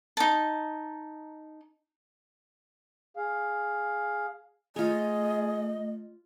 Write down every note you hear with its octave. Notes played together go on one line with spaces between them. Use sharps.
D#4 A5
G#4 F5
A3 F4 G#4 C#5 D#5